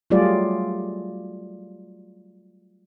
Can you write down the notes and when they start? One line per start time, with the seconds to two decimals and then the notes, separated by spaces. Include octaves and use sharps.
0.10 F#3 G3 A3 F4 G#4 D5